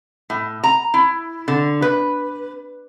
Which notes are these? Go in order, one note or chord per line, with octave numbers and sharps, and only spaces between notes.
A2
A#5
E4
D3
B4